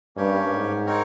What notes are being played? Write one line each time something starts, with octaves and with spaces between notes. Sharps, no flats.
G2 A#3 C#4 G4 C#5
G#2
C4 D#4 A#4 C#5